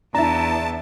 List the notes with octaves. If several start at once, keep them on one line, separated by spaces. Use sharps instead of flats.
E2 D4 E4 A5 A#5